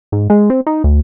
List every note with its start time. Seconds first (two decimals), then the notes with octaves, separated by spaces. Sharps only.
0.12 G#2
0.30 G#3
0.50 C4
0.67 D#4
0.84 D2